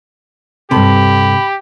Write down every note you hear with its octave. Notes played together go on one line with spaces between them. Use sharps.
G2 C3 G4 A4 A5 B5